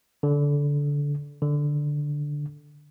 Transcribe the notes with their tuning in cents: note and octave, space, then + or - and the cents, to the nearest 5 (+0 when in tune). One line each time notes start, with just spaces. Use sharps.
D3 -20
D3 +0